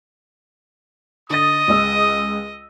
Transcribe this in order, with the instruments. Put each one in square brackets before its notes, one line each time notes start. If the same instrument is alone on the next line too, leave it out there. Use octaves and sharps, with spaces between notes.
[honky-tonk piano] D3 A6 [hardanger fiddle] D#5 [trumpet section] D#6
[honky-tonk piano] C#2 G#3 E6